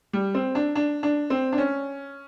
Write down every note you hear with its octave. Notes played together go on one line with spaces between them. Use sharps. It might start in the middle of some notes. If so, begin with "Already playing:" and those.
G3
C4
D4
D4
D4
C4
D4
C#4